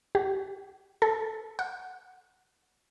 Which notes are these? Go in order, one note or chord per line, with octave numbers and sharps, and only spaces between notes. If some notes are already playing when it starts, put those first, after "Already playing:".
G4
A4
F#5